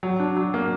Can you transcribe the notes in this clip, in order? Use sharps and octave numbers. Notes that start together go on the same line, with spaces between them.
F#3
D4
F#3
A#3